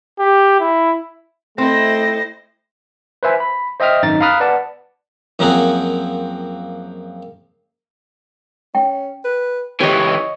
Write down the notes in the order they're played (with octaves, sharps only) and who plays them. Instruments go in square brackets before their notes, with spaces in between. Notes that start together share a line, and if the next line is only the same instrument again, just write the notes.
[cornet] G4
E4
[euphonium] A3 [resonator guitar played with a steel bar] C4 [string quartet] E4 C5 D#5 [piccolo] A#6
[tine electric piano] B4 C5 E5 G#5
B5
C5 D#5 E5 G5 D#6 F6
G#1 F#2 D#4 A6
F5 A#5 B5 D#6 F6 F#6
B4 D5 F#5 A5
[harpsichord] F#2 F3 A#3 C4 F#4 G#4
[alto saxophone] C#4 [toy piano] G5
[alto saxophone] B4
[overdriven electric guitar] C#2 E3 [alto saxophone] G4 [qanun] C#5 D#5